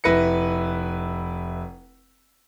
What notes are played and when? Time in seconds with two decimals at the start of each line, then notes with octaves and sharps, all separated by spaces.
0.04 F1 E4 B4 A#6 C#7